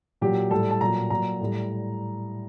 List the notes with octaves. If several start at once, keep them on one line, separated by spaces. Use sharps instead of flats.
A#2 F#3 G4
A2 G3 A4
A5
A#2 F#3 A#5
A#2 F#3 A#5
A2 G3